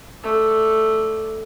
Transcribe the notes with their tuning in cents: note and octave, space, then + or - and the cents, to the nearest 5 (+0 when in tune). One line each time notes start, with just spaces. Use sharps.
A3 +0 D5 +0